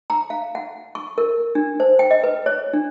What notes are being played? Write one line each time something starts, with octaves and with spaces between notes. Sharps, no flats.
A#5
F5
F#5
C#6
A#4
D4
C5
G5
D#5
B4
C#5
D4